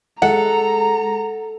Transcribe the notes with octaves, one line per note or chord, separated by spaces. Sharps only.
G#3 A4 F#5 A#5